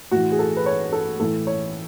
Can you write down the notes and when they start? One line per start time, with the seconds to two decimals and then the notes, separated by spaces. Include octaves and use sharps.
0.11 A2 E3 F#4
0.32 G#4
0.39 A4
0.57 B4
0.66 C#5
0.92 A4
1.20 A2 E3 A4
1.47 C#5